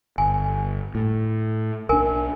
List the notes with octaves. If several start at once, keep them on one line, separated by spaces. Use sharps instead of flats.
G1 G#5
A2
B1 D4 A#4 G#5